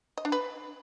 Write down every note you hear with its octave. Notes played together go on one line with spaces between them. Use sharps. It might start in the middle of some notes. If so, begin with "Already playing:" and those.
D#5
D4
B4